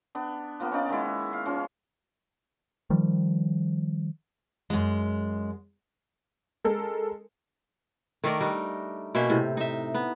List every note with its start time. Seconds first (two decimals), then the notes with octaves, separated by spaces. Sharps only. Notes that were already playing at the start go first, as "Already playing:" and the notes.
0.15 B3 D4
0.60 F3 A#3 B3
0.72 C#4 D#4 D5
0.89 D#3 G#3 E4
1.33 F5
1.45 F3 C#4
2.90 D#3 F3 G3
4.70 F#2 G#3
6.64 G#3 A4 A#4
8.24 D#3 A3 A#4 D5
8.40 G3 D4 D#4
9.15 B2 A#3 C#4 E5
9.30 A2 C3
9.57 D#4 E5
9.94 B3